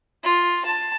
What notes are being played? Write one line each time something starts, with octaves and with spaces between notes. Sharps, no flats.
F4
A5